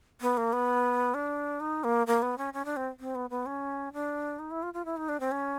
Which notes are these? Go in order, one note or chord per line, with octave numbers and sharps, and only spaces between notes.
B3
A#3
B3
D4
D#4
A#3
A#3
B3
C#4
C#4
D4
C4
C4
B3
B3
C#4
D4
D#4
E4
F4
F4
E4
D#4
D4
C4
C#4